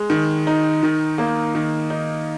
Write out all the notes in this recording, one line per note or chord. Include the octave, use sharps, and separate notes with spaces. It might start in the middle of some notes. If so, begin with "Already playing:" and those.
Already playing: G#3
D#3
D#4
D#3
A#3
D#3
D#4